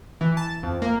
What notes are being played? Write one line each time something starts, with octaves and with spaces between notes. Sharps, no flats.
E3
A5
F2
A#3